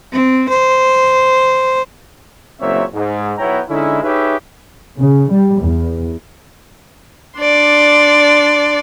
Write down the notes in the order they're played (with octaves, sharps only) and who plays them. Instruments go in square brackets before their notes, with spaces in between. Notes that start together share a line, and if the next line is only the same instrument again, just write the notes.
[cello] C4
C5
[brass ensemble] F#1 F#2 A#2 C4 C#5 E5
G#2
B1 B3 E4 C#5 G5 A#5
D3 G#3 C#4 D#4 E4
D#4 G4 G#4 B4 C#5 E5
[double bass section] C#3
G3
E2
[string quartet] D4 D5 C6